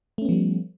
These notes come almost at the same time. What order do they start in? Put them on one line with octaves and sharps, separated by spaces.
A3 C#4 B3 F3 G3